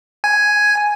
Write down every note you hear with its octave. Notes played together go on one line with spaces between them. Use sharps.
G#5